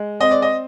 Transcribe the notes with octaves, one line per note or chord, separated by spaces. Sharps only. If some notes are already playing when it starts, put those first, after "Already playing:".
Already playing: G#3
C4 D#5
D5
D#5